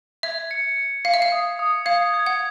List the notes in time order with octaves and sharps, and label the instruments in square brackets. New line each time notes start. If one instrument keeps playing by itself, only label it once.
[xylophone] E5 [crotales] G#6
[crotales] C#7
C#7
[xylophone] F5 [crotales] C#7
[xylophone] E5
F5
[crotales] D#6
D#6
[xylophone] F5 [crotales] G#6
[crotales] G#6
[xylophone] F#5